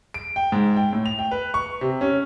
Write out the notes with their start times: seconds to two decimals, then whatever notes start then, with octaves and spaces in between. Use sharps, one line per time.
0.14 D7
0.36 G5
0.52 G#2
0.77 G5
0.93 A2
1.06 F7
1.19 G5
1.31 B4
1.54 C#6
1.81 C3
2.01 C#4